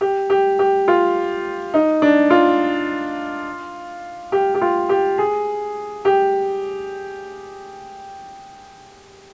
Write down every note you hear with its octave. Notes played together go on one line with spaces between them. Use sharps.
G4
G4
G4
F4
D#4
D4
F4
G4
G4
F4
G4
G#4
G4